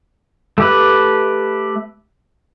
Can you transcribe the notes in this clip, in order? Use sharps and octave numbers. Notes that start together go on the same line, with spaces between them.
A3 G4 B4